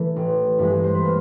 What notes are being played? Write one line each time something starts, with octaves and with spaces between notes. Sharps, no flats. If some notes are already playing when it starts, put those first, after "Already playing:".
Already playing: E3 A3 A4
A1
G2 E3 G#3
C5
B4
A#3